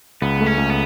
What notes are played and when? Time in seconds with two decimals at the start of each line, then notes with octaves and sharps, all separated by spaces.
0.22 C#2 B3
0.40 A3
0.46 C#4
0.58 C#2
0.70 B3